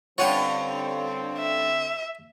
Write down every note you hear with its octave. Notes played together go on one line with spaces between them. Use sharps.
G2 D3 C4 C#4 F4 C#5 F#5 G5
E5